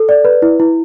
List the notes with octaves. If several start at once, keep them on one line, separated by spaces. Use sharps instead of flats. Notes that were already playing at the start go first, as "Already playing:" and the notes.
Already playing: A4
D5
B4
E4
E4